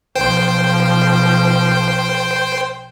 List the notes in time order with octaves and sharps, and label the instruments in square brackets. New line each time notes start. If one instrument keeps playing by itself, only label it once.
[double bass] B1 F3 [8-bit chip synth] C5 G5